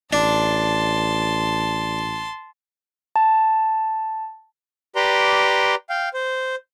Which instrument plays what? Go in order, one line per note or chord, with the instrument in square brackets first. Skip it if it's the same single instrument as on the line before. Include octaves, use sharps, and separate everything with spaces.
[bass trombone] A1 [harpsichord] D4 [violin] A5 C6
[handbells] A5
[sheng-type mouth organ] G4 B4 D5 A#5 C6
F5 G5
C5